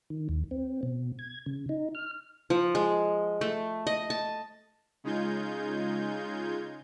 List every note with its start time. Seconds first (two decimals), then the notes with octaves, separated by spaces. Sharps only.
0.10 D#3
0.29 D#2
0.51 C4
0.83 B2
1.19 G#6
1.46 C#3
1.69 D#4
1.95 F6
2.50 F3
2.75 G#3
3.41 A3
3.87 D#5
4.10 A5
5.04 C#3 G#3 D#4 F4 G6 G#6